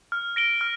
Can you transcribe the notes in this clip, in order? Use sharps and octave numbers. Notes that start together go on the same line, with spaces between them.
F6
A#6 D7 G7
F6